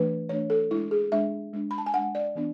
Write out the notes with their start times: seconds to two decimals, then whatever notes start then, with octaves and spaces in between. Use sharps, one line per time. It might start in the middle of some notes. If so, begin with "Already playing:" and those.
Already playing: E3 A3 D4 B4
0.29 E3 A3 D4 C#5
0.50 A4
0.71 G#3 D4 E4
0.91 G#4
1.12 G#3 D4 E5
1.53 G#3 D4
1.71 B5
1.78 A5
1.86 G#5
1.94 G#3 D4 F#5
2.15 D5
2.35 E3 B3 D4